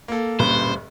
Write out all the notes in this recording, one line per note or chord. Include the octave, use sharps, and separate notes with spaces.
A#3 A4
D1 G2 A#2 A#3 C#4 B4 C5